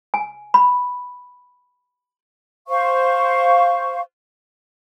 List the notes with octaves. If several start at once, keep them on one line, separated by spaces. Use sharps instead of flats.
G#5
B5
C5 F5 C#6